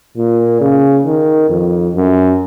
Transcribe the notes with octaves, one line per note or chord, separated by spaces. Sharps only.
A#2
C#3
D#3
F2
F#2